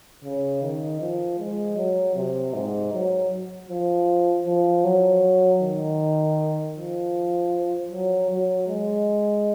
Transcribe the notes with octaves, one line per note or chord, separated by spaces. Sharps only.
C#3
D#3
F3
G#3
F#3
C3
G#2
F#3
F3
F3
F#3
D#3
F3
F#3
F#3
G#3